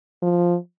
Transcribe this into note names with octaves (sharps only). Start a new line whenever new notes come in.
F3